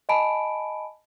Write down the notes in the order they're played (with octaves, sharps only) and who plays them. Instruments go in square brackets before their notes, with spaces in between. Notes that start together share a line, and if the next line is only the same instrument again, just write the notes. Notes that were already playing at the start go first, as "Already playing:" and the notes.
[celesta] D#5 G#5 A5 B5 D7